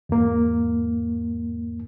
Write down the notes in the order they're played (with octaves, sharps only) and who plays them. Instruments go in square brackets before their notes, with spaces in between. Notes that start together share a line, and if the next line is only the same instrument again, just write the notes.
[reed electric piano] E2 G#2 A#3